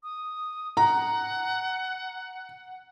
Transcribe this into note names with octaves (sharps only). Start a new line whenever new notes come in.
D#6
F#5 A#5